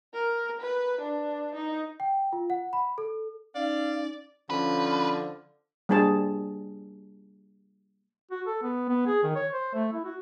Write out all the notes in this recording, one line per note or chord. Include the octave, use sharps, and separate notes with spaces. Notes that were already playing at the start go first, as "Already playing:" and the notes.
A#4
B4
D4
D#4
G5
F4
F#5
B5
A4
C#4 D#4 D5 F5
D3 F3 C#4 B4
G3 A#3 D4 G#4 C5 A5
F#4
A4
B3
B3
G#4
D#3
C#5
C5
A3
E4
F#4